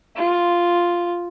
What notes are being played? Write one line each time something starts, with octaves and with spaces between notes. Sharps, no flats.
F4